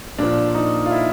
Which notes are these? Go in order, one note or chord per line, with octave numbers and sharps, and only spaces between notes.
A#2 F3 D4
D#4
F4
E4